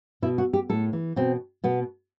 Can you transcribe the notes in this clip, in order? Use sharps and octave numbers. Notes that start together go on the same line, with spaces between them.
B2 E4
F#4
G4
A2 A4
E3
B2 C4
B2 B3